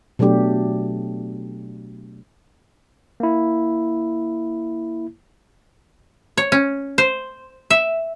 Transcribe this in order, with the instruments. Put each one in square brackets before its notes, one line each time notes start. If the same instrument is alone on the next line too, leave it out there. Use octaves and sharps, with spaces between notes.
[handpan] B2 F#3 A3 D4 G4
[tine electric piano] A#3 E4
[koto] C#5
C#4
C5
E5